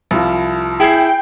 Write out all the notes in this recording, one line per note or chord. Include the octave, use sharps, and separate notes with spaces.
C2 F3
E4 G#4 G5 C7